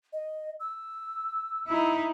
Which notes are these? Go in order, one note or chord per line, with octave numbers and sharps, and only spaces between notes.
D#5
E6
D#4 E4